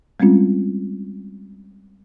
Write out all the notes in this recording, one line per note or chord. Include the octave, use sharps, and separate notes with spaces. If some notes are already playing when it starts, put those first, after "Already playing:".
G3 G#3 C4 C#4 F4